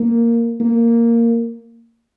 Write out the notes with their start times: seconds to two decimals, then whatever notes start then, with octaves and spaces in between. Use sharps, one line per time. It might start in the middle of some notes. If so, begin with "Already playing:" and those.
Already playing: A#3
0.60 A#3